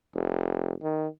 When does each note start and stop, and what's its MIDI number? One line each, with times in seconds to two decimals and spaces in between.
0.15 0.73 29
0.82 1.07 51